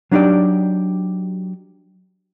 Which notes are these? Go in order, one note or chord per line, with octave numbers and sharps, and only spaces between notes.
F#3 D4 D#4 F#4 G4 D5